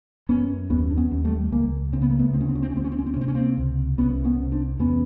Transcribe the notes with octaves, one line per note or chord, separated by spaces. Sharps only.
F#2 B3 C#4
D#2 B3 C#4
D4
B3 C#4
D#2
G3 A3
C#2 G#3 A#3
C#3 C4
B3
A#3
A3 B3
D2 C4
C#4
C4
C#4
C4
C#4
D2 C4
C#4
C4
C#4
C4
C#4
C3 C4
C#4
A#3 C4
C#2
C2 B3 C#4
B3 C#4
C3
C4 D4
E2 B3 C#4